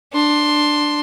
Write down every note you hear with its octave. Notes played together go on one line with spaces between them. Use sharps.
D4 C6